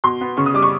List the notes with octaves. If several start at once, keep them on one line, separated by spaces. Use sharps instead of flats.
B2 C6
B3
C#3 C#6
D#6
G3 D6
C#6